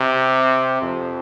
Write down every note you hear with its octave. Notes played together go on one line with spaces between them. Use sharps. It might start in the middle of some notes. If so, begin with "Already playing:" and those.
Already playing: C3
F2